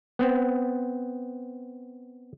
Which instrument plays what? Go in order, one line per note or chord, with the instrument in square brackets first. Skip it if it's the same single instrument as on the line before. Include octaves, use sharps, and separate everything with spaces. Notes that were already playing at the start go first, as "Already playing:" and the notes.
[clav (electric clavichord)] B3 C4